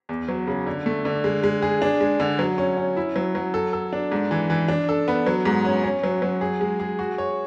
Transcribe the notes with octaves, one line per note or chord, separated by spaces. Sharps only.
E2
F#3
C#3
D3
A3
D3
G#3
G#3
G#4
D4
G#3
D3
F#3
C#4
C#4
E4
F#3
F#3
A4
A4
D4
G#2
E3
E3
D4
A4
B3
F#3
G#2
C#4
C#4
F#3
F#3
G#4
G#3
G#4
F#4
C#5